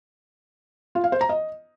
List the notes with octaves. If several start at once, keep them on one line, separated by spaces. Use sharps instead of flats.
F4
F5
C5
A#5
D#5